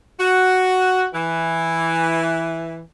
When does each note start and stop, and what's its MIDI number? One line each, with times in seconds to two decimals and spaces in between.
0.20 1.07 66
1.14 2.81 52